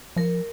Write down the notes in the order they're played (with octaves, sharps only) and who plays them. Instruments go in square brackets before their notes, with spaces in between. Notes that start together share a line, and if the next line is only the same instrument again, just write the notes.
[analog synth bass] F3 [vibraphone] A#4